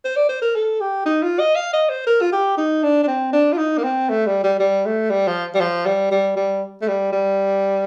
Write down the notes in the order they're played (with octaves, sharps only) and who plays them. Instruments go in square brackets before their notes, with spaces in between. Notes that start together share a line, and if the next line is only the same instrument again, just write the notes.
[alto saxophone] C5
D5
C5
A#4
A4
G4
D#4
F4
D#5
F5
D#5
C5
A#4
F4
G4
D#4
D4
D4
C4
D4
F4
D#4
A#3
C4
A3
G3
G3
G3
A3
G3
F3
G3
F3
G3
G3
G3
A3
G3
G3